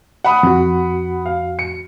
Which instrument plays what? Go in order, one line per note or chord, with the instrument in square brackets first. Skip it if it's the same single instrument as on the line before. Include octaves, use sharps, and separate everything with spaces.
[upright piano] F#5 B5 D#6
[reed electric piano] F2 F#4
[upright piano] F5
C#7